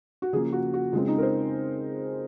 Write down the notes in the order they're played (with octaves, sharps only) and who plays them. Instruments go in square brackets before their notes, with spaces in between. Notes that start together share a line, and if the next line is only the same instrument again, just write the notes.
[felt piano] F#4
C#3 F3 A#3 G#4
F#4
F#4
C#3 G#3 C4 F4
D#4
A#4
C5